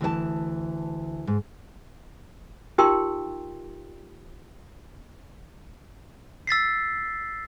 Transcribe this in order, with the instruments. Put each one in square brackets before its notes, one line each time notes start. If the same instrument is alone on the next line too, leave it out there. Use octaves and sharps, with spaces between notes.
[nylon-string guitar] D2 E3 C5 A5
G#2
[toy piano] D#4 F4 G4 A#4 G5 C6
[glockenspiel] E6 A6 B6 C7